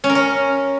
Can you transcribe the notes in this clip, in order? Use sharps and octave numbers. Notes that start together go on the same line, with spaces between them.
C#4
A#4
C#4